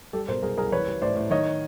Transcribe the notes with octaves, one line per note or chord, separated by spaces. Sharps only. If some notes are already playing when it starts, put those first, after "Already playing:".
G3 G4 A4
B2 A#4 C5
C2 G#4 A#4
C2 G#4 A#4
E3 B4 C#5
G3
A2 C5 D5
A2
D#3 C#5 D#5